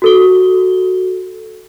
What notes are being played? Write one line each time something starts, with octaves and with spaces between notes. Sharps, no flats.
F#4 A4 G7